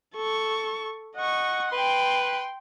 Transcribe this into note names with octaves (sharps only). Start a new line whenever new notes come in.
A4 C#6
D#5 F#5 C#6
B4 G5 C6